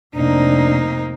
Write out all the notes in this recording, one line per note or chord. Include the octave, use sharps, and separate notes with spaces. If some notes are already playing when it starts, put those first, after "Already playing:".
F1 A#3 C4 D4 D#4